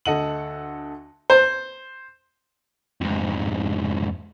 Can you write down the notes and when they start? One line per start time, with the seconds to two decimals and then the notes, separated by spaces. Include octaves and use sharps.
0.05 D2 A4 D#5 F#5 D#7 F#7
1.30 C5
3.01 F2 G#2